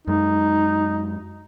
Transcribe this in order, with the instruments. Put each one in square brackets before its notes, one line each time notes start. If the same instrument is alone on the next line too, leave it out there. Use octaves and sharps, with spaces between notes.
[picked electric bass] F#2 G#3 [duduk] D#4